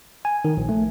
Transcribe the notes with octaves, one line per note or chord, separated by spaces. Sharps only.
G#5
D#3
A#1
A3